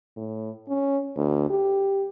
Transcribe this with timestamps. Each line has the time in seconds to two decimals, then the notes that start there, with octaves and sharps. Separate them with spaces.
0.16 A2
0.69 C#4
1.16 D2
1.50 G4